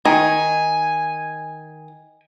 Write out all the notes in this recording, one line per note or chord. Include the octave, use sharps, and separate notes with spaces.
D#3 G#5